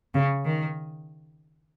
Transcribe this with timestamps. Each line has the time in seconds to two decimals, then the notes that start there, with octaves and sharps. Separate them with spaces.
0.14 C#3
0.45 D#3